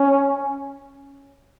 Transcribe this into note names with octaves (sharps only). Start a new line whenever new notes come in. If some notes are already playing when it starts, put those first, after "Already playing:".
Already playing: C#4